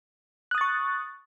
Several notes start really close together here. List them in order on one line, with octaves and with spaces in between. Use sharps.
F#6 D#6 A6 C#6